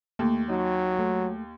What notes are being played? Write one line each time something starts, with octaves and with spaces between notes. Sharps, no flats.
D#2 A3
F#3 D#4
A3